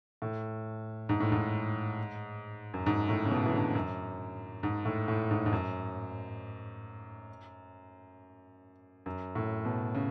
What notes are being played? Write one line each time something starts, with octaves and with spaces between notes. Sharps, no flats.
A2
G#2
A2
G#2
F#2
G#2
A2
C#3
B2
E3
D3
F#2
G#2
A2
A2
G#2
G#2
F#2
F#2
A2
B2
C#3